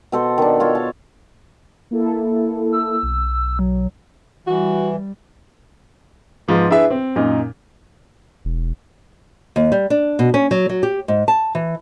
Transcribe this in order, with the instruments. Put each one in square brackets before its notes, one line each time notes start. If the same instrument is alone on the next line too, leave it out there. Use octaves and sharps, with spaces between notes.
[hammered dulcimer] B2 A4 C5
D#3 D4
F4 A4 C#5
A5
[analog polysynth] A#3 E4 A4
[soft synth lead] E6
[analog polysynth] B1
[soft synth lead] F#3
[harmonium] E3 [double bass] G3 [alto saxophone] F#4
[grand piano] G#2 F3 B3
D4 E4 G#4 B4 E5
C4
F#2 A#2 D#4
[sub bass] E1
[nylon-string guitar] D#2
G3
D4
B2
C#4
F#3
F#3
G4
G#2
A5
E3